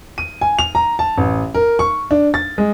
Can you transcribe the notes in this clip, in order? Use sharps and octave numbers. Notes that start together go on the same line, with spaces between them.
D#7
G#5
F7
A#5
A5
A1
A#4
C#6
D4
A6
G#3